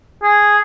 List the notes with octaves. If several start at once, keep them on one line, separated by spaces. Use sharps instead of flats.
G#4